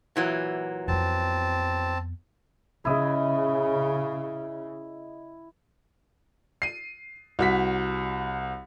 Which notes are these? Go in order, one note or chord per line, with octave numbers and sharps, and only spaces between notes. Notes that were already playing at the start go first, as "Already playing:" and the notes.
A#2 E3 F#3
F2 B3 C4 A5
C#3 E4 D#5
C7 D#7
C2 F#4 B6